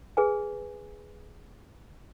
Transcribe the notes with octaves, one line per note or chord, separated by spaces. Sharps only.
G#4 B4 G#5